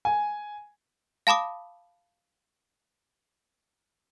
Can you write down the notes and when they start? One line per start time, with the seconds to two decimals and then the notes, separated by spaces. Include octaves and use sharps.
0.05 G#5
1.27 F5 A5 B5 D6 D#6